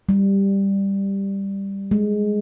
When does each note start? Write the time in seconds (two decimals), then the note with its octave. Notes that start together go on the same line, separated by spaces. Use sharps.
0.09 G3
1.91 G#3